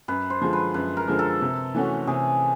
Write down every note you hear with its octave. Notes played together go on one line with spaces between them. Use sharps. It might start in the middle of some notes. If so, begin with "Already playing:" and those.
F#2 B4
C5
D3 F3 G#3
B4
F#2 B4
A#4
D3 F3 G#3
A4
C3
E3 A3 C#4 F#4
C3 G#4